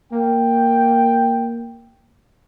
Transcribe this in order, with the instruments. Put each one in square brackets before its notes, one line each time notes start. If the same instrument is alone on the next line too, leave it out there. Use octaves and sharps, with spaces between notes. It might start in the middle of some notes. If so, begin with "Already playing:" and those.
[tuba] A#3 [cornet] G5